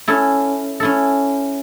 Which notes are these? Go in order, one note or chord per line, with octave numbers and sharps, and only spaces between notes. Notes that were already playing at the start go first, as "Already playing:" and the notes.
C#4 E4 A4
C#4 E4 A4